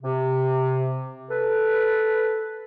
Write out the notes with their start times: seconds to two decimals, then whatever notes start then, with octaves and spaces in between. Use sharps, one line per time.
0.03 C3
1.30 A4 B4